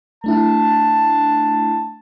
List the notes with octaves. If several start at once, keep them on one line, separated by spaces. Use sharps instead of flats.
A3 D4 E4 A5